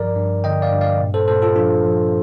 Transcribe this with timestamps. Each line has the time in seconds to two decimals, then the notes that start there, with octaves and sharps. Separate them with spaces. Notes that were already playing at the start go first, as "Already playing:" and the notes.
Already playing: G2 F3 A#4 D5
0.16 G2
0.44 D3 D#5 G5
0.62 D5 F5
0.72 G2
0.81 D5 F5
1.00 A#2
1.14 A4 C5
1.28 A#2 A4 C5
1.42 F4 A4
1.56 F3 D4 F4
1.84 F3